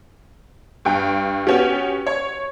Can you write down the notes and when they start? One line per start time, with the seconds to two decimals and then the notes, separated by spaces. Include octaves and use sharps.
0.85 G2 G5
1.47 B3 C#4 F#4 G4
2.07 C#5